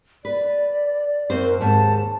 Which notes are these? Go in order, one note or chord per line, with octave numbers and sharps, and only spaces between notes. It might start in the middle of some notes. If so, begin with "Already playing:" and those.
B4 D5
F#2 C4 C5
A#4
D#2 G#2 A5